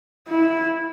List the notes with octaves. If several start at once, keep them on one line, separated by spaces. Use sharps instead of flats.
E4